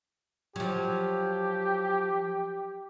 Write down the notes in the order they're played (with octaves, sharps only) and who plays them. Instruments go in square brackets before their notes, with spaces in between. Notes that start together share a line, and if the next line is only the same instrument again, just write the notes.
[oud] F3 F#3 [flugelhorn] G4